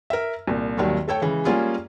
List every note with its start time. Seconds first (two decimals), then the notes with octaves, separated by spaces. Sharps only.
0.10 A#4 E5
0.47 C2 A#2
0.77 G#1 D#2 D#3 F#3 G3
1.08 A3 A4 C#5 G5
1.22 C#3 E3 G#3
1.45 G3 G#3 A#3 C#4 F4 G#4